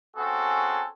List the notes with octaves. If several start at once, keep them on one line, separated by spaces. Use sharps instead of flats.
A3 C4 C#4 F#4 G#4 A4